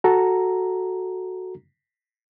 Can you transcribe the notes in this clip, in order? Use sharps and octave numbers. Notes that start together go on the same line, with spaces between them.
F#4 A4 A#5